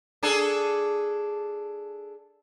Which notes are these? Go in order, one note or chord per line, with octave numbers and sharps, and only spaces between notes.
D4 G#4 A4